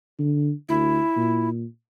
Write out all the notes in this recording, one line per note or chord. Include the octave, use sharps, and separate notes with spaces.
D3
D2 E4
A#2